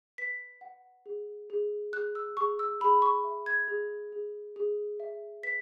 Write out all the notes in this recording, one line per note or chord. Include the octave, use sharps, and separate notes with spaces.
B4 B6
F#5
G#4
G#4
G#4 F#6
E6
G#4 C#6
E6
G#4 B5
C#6
E5
G#6
G#4
G#4
G#4
E5
B4 B6